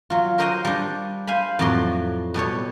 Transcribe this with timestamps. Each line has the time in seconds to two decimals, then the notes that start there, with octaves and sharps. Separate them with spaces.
0.10 F#3 F4
0.38 F#4 A#4 C5 D#5 F5 G5
0.65 G3 D4
1.27 C5 F5 G#5 B5
1.59 F2 A2 F#3 F#4 D5 C6
2.34 B2 G3 A4 C#5